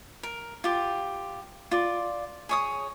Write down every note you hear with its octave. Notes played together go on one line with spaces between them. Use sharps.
A#4
F4 G4
F4 D5
G#4 C#5 D#6